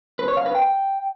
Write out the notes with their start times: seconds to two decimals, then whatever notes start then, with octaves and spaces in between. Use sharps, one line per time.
0.19 B4
0.28 C#5
0.37 F5
0.46 B4
0.55 G5